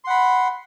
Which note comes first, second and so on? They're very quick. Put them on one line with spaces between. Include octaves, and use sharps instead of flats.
C6 F#5 B5